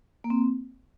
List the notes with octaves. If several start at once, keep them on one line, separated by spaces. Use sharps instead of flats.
A#3
C4